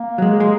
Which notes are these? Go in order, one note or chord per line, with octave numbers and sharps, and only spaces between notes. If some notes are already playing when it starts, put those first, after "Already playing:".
Already playing: A#3
F#3
G#3
G#3